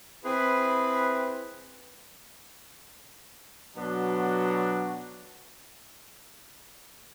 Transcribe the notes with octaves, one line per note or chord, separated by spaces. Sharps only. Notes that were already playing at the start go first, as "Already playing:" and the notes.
C4 E4 G#4 B4
B2 F#3 B3 D4 F#4